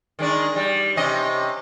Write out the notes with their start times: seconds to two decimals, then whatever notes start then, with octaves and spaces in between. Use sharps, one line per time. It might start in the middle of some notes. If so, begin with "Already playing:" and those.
0.19 D#3 G#3 D4
0.56 G3
0.96 C3 C#4 D#5